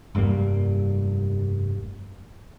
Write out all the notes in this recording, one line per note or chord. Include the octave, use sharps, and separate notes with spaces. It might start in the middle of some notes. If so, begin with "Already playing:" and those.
F1 G2 G3 A#3